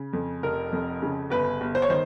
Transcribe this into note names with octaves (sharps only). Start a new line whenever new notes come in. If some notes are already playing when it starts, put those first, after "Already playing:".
Already playing: C#3
F2
F1 A#4
F2
C#3
G1 B4
G1
C5
C#5
D#3 C5